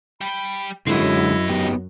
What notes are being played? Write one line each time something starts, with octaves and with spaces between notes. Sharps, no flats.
G3 G5 B5
F#2 D3 F#3 G#3 C4 E4 D#5
B3 D#4 G4